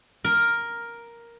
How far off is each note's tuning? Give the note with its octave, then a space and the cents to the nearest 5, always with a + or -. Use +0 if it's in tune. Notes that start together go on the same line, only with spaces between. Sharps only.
A#4 +5